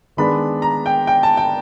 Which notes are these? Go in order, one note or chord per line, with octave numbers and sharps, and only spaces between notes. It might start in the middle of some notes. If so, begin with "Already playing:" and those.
D#3 G#3 B3 D4 B5
A#5
G5
G5
A5
G5